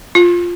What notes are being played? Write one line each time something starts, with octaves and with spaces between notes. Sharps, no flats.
F4